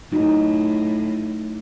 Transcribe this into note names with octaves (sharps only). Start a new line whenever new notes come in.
A2 F#3 D#4 F#4